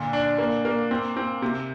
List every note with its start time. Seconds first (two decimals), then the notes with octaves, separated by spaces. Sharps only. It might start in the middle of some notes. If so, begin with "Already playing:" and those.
Already playing: A#2 D3
0.13 D4
0.38 A#3
0.65 A#3
0.91 C4
1.17 C4
1.42 C3